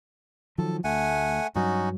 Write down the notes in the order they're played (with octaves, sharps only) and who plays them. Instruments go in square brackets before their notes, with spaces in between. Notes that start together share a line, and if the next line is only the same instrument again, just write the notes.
[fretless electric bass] D#3 F3 F#3 [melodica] A4
[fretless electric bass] D2 [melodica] A3 F#5 G#5
[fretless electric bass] G2 F#3 [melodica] C#4 D#4 F#4